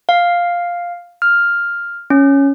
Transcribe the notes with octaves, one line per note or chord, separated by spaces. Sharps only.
F5
F6
C#4